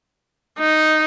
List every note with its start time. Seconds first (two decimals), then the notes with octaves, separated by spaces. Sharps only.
0.59 D#4